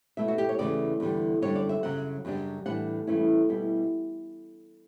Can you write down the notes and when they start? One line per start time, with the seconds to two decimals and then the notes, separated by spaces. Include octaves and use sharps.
0.17 B2 A3 E4 E5
0.28 F#4
0.38 G4
0.49 C#5
0.58 E2 C#3 E3 A3 D5
1.00 E2 D3 G3
1.42 F#2 D3 G3 D4 C#5
1.56 D5
1.69 E5
1.83 F#2 C#3 F#3 F#5
2.25 F#2 C#3 G3 D4
2.66 A2 E3 G3 D4 F#5
3.07 G2 E3 A3 C#4 E4
3.49 B2 G3 B3 E4